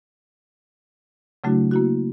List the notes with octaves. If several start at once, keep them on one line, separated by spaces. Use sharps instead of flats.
C#3 F#3 A3 D4 E4 F#4
A#3 E4 F#4